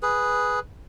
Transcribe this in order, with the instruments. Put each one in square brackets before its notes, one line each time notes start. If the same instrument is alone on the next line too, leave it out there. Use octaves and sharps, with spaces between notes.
[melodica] G#4 B4